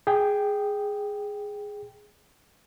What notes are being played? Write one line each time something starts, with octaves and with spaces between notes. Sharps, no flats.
G#4 G5